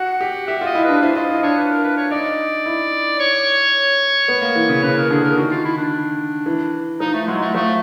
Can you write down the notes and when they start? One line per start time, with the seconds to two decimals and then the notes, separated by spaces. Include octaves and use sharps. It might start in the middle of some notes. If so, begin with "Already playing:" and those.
Already playing: F#4 F#5
0.21 G4
0.47 G4 E5
0.61 F4
0.67 D#5
0.75 E4
0.85 D4 B4
1.02 E4 C5
1.15 F4 D#5
1.29 E4 D#5
1.43 D4 C#5
1.57 B4
1.71 A#4
1.84 B4
1.97 C#5
2.11 D#4 D5
2.66 E4
3.20 C#5
4.28 B3
4.42 A#3
4.55 E3
4.69 C#3
4.83 C#3 B4
4.97 A#4
5.10 D3 G#4
5.24 A#4
5.37 D#3 F#4
5.51 F4
5.65 E4
5.78 D4
6.46 E3
7.00 F3 D#4
7.14 A3
7.27 F#3 G#3
7.41 A3
7.54 F3 A3